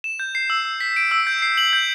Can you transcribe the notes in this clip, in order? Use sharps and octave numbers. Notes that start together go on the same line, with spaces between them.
E7
G6
C7
E6
E6
B6
D7
E6
G6
C7
F#7
G6